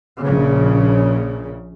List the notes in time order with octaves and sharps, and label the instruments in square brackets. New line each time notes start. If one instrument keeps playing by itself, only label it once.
[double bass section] A#1 C#3